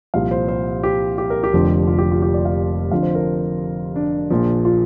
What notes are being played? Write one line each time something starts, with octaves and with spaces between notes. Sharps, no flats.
C2 A#2 F3 F5
C5
C5
G4
G4
A#4
G4
F1 F2 D3 F3
F4
G4
F4
G4
D5
F5
F2 D3 F3 F5
C5
A#4
D4
A#1 A#2 F3
F4